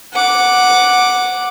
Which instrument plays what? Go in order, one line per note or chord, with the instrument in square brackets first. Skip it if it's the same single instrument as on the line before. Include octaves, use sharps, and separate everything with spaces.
[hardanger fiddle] F#5 D6